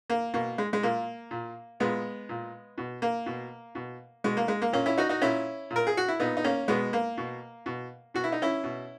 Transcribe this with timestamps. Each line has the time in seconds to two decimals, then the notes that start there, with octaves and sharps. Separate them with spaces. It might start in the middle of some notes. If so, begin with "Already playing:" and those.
0.10 A#3
0.34 B2 A#3
0.58 G#3
0.73 G#3
0.83 A#2 A#3
1.31 A#2
1.80 A#2 G#3 B3
2.29 A#2
2.78 B2
3.02 A#3
3.26 B2
3.75 B2
4.24 B2 G#3
4.37 A#3
4.48 G#3
4.62 A#3
4.73 A#2 A#3 C#4
4.86 C#4 E4
4.98 D#4 F#4
5.09 D#4 F#4
5.22 A#2 C#4 E4
5.71 A#2
5.76 A#4
5.87 G#4
5.97 F#4
6.08 E4
6.20 A#2 B3 D#4
6.37 D#4
6.44 A#3 C#4
6.68 B2 G#3 B3
6.93 A#3
7.17 B2
7.66 B2
8.14 B2 F#4
8.24 E4
8.32 D#4
8.42 C#4 E4
8.63 B2